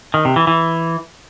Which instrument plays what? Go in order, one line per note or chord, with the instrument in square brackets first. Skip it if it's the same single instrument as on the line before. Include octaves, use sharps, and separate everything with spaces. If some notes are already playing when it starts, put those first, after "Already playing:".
[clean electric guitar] D#3
C3
E3
E3